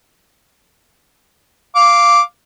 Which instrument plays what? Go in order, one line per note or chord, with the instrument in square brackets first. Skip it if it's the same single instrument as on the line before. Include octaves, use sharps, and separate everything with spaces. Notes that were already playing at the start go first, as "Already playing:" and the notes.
[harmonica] F5 D6